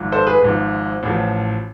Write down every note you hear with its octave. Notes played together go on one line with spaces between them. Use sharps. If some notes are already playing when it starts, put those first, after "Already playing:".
Already playing: G#1 G#2 F3
A4 C5
G#4 B4
G#1 G#2 F3
A1 A2 F3